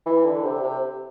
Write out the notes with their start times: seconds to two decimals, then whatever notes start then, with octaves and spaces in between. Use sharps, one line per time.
0.06 E3
0.25 D3
0.44 C3
0.63 C3